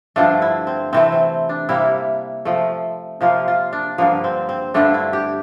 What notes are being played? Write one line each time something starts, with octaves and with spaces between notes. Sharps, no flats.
G2 D3 F3 A3 D4
E4
C4
C3 E3 A3 C4
C4
D4
C3 G3 A#3 E4
C3 F3 A3
C3 F3 A#3 F4
F4
D4
G2 D3 F3 A#3
C4
C4
G2 D3 A3 D4
E4
G4